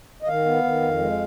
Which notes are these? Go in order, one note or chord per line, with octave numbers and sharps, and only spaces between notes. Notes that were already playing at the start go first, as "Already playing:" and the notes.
D#5
D#3 F5
B3
D#3
F2
G#3